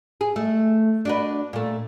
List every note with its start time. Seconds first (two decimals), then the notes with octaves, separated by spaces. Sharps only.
0.21 G#4
0.36 A3
1.05 D4 F#4 B4
1.53 A#2 A3